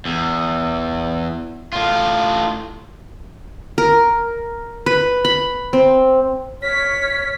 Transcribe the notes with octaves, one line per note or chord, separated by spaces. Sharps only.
E2
A2 F4
A#4
B4
B5
C4
C#5 F6 B6